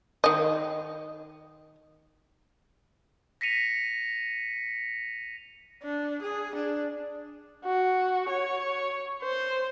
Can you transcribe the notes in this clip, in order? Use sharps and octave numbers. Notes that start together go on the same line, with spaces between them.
D#3 D#5
A#6 B6 C#7 D#7 F7
D4
G#4
D4
F#4
C#5
C5